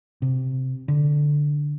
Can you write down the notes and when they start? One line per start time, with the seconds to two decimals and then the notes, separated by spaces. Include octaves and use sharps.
0.22 C3
0.88 D3